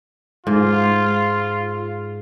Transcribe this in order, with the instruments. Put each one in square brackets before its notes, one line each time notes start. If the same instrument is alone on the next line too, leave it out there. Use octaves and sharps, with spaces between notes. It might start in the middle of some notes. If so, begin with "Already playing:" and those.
[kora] G#2 [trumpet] F4